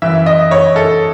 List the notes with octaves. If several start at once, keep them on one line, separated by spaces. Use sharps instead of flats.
F#2 E3 E5
D#5
C#5
A4